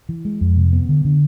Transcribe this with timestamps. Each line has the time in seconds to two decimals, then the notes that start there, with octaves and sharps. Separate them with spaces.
0.09 E3
0.25 G#3
0.41 F2
0.57 C3
0.73 B3
0.89 D3
1.05 D3